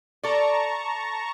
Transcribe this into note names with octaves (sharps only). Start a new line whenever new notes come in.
A4 D5 A5 A#5 C#6